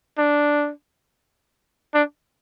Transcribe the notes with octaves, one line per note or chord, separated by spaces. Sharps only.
D4
D4